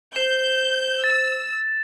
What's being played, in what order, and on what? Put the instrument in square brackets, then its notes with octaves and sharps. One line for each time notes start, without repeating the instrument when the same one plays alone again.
[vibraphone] C5 [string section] G6 [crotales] E7
[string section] E6 [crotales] A6